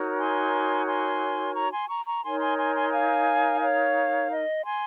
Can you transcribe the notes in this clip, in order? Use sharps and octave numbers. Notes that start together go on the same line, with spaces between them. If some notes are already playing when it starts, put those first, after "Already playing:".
Already playing: D#4 F#4 A#4 C#5
G#5 C6
G#5 C6
A#5 C#6
G#5 C6
A#5 C#6
A#5 C#6
D#4 A#4 C#5 G#5 C6
G#5 C6
G#5 C6
G#5 C6
F5 G#5
C#5 F5
D#5
G#5 C6